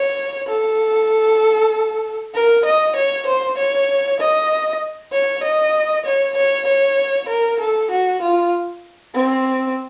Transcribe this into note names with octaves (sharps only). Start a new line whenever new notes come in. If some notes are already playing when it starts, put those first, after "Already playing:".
Already playing: C#5
A4
A#4
D#5
C#5
C5
C#5
D#5
C#5
D#5
C#5
C#5
C#5
A#4
A4
F#4
F4
C4